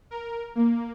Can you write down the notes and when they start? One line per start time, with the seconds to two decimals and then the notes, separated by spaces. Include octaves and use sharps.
0.11 A#4
0.55 A#3